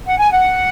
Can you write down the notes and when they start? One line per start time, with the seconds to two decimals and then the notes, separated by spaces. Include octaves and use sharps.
0.06 F#5
0.18 G#5
0.31 F#5